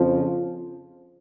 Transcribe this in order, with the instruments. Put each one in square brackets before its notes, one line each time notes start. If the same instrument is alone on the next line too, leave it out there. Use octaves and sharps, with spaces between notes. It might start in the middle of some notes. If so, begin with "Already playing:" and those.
Already playing: [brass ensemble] F2 C#3 F3